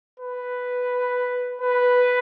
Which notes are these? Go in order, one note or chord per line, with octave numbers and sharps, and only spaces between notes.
B4
B4